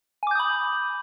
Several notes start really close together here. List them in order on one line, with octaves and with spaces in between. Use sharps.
G#5 D6 G6 D#6 B5